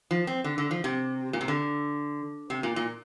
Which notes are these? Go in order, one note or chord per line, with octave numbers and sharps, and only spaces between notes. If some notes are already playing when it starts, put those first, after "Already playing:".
F3
C4
D3
D3
F3
C3
A#2
C3
D3
C3
A#2
A#2